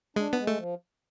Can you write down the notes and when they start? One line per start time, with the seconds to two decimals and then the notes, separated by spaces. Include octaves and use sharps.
0.16 G#3 D4
0.33 G#3 B3
0.47 A3
0.57 F3